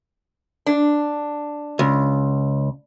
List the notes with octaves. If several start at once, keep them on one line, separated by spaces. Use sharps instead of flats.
D4
C#2